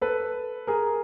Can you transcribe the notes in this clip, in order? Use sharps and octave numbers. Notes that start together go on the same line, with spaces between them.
A4 B4
G#4 A#4